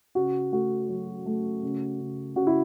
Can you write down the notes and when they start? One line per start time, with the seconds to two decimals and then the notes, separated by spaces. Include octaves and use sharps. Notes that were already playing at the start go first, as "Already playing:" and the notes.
0.15 C#3 F#4
0.52 A3 F#4
0.89 F#3
1.26 A3
1.63 C#3
2.00 C#3
2.36 C#3 F#4
2.47 E4